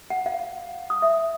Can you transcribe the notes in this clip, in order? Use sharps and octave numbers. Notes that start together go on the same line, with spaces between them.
F#5
F5
D#6
E5